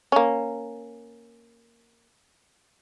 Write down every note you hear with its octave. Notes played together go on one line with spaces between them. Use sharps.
A#3 C#4